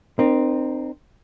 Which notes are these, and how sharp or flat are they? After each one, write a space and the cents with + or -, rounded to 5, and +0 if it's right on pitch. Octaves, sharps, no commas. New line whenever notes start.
C4 +0 D#4 -40 A#4 +20